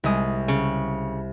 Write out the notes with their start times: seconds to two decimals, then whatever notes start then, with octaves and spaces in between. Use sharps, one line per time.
0.04 C2 G#3 D#6
0.48 C#3